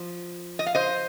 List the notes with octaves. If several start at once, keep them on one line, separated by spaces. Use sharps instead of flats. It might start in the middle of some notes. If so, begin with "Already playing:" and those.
Already playing: F3
D#5
F5
C5 D#5